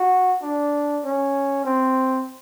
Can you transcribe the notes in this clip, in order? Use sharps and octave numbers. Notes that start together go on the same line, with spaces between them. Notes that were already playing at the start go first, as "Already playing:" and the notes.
Already playing: F#4
D4
C#4
C4